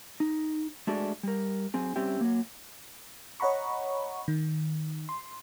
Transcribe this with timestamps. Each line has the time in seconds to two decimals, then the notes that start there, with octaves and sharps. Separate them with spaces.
0.20 D#4
0.87 G#3 A3 D4 F#4 G#4 D5
1.23 G3 A#4
1.74 F#3 C4 G#4
1.96 G3 C4 C#4 G4 E5 G5
2.21 F#3 A#3
3.40 C#5 D#5 F#5 A#5 B5 C#6
4.28 D#3
5.09 C6